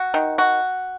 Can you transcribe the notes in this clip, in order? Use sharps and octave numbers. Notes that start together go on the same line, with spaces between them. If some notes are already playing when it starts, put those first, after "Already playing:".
Already playing: F#4
D#3
F#4